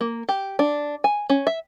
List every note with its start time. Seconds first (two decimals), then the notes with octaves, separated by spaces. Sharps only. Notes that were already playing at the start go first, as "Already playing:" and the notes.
0.01 A#3
0.29 G4
0.59 D4
1.04 G#5
1.30 C#4
1.47 E5